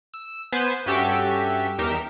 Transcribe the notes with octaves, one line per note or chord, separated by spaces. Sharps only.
E6
B3 B4 C5 G#5
G2 C#4 F#4 G4 A4 E5
E2 D#4 G4 A#4 B6 E7